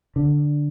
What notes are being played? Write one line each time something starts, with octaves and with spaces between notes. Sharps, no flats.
D3